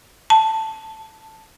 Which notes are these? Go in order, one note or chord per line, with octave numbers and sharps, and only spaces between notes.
A5